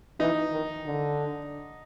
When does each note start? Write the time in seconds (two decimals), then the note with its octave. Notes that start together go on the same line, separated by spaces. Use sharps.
0.20 E3 D#4
0.52 D#3
0.86 D3